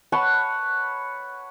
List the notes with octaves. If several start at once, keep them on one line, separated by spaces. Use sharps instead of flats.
B4 C#5 F#5 A5